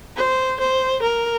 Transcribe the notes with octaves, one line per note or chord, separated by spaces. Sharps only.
C5
C5
A#4